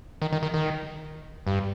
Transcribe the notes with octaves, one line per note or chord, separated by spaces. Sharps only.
D#3
D#3
D#3
D#3
G2